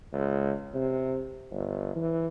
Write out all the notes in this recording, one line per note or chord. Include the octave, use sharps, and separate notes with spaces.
C#2
C3
G1
E3